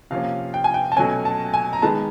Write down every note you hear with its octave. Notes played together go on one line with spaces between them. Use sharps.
C3 F3 A#3 C#4 F5
G5
G#5
G5
A5
B2 F#3 A3 C#4 G#5
A5
G#5
A#5
D#3 G#3 B3 A5